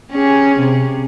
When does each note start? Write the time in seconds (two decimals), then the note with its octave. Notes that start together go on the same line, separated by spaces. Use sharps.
0.11 C#4 G4 G#4
0.59 C3